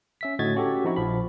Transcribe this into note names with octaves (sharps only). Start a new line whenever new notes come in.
C#4 E5 B6
A2 D3 F#4 D#5 G#6 A6
C#4 F#4 G4 A4
F3 C4 D#4 E4 F#4
A#1 F3 B5